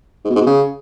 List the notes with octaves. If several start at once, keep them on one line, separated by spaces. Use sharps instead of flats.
G#2
B2
G#2
B2
C#3